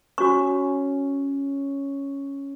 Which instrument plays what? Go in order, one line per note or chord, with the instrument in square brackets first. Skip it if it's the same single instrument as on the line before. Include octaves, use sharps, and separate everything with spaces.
[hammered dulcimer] C#4 [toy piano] F#4 C#6